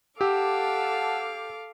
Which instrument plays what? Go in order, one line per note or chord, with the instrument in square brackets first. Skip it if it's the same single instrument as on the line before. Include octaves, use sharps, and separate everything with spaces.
[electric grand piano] G4 [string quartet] A4 F5 D6 [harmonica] F#5 A5 E6